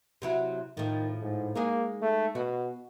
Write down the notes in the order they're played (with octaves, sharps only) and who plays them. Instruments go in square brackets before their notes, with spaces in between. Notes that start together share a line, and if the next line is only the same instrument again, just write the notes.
[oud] C3 F#3 E4
[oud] A2 F3 [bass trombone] D#3
[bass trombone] G#2
[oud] G#3 D#4 G#4 [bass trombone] A#3
[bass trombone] A3
[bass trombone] B2 [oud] F#4